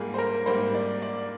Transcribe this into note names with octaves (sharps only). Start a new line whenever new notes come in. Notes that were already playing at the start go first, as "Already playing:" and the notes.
Already playing: G#2 G3 A#3 F4 G#4
C5
A#4
G#2 G3 A#3 C5
D5
D5